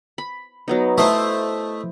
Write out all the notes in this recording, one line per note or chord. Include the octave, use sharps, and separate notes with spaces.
B5
F#3 B3 D#4
A3 E4 C5 D#5